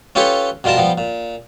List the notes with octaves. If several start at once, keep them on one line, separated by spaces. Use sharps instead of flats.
C#4 F4 G4 A4 B4 C#5
B2 G3 F4 A#4 A5
F3 G3 B3
A#2